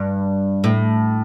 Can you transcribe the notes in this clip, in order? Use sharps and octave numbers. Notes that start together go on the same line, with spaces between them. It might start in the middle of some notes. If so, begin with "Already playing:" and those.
Already playing: G2
A2